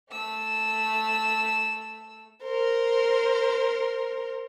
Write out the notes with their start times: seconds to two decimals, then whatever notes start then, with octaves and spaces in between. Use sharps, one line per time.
0.11 A3 E6
2.43 A#4 C5